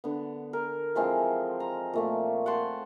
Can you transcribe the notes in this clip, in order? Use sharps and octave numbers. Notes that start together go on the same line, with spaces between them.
D3 B3
A#4
E3 F3 G#3 C4
A#5
A#2 A3 A#3
F#5 G5 A5 C6